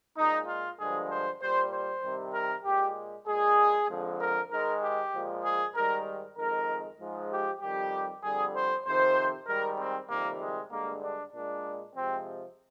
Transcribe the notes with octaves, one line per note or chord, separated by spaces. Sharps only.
A#2 G#3 D#4
F4
G2 D3 F3 G#3 G#4
C5
A#2 G3 C5
C5
C3 D#3 G3
A#4
A#2 G#3 G4
A#2 G#3 G#4
F2 D3 F3 G#3
A#4
G#2 D#3 G#3 A#4
G4
A#2 F3 G#3
G#4
G#2 D#3 G3 A#4
F2 D#3 G#3 A#4
G#2 F3 G#3
G4
F2 D#3 G3 G4
F2 D3 G3 G#4
C5
F2 C3 D#3 C5
G#2 D#3 G3 A#4
C4
F2 C3 D#3 G3 A#3
G#3
G2 D3 G#3 A#3
D4
A#2 G#3 D4
C3 F3 G#3 C4